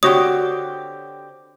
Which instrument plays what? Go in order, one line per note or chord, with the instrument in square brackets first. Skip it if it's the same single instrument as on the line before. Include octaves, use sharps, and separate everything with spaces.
[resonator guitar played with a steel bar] D3 C4 G4 [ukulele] F#4 C#5 [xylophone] D#6